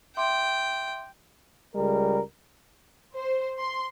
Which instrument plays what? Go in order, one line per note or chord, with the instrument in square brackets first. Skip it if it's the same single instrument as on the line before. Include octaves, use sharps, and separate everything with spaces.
[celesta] E5 C6 D6 [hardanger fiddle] G5
[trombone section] C#2 G3 G#3 A#4
[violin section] C5
C6